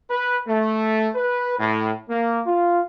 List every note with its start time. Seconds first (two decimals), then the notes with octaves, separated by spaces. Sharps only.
0.10 B4
0.47 A3
1.15 B4
1.59 A2
2.09 A#3
2.45 F4